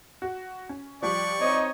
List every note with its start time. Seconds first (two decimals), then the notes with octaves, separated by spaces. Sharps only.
0.22 F#4
0.69 C#4
1.03 F3 G3 G4 D5 C#6 F#6
1.40 C4 D#4 C#5 D#5